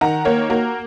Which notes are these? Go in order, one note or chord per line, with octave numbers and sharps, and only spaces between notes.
D#3 F#5 A#5
A#3 A#4 C#5
A#3 F#4 A#4